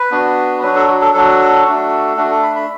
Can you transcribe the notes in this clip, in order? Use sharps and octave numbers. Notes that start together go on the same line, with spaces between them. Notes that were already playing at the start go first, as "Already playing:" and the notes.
Already playing: B4
B3 D4 F#4
F#3 D4 F#4 B4
A4
F#4
A4
F#3 D4 F#4 A4
A3 D4 F#4
A3 D4 F#4
A4
B5
B5